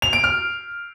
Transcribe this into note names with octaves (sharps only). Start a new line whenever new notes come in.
F7
D7
F6